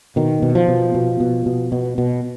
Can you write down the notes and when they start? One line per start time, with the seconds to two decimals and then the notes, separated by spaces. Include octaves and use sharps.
0.16 B2 D#3
0.42 B2
0.55 F3
0.68 B2
0.95 B2
1.20 B2
1.46 B2
1.72 B2
1.98 B2